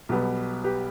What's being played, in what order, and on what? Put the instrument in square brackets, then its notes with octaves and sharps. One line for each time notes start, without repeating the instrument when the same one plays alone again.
[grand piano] B1 B2 G3 B3
G4 B4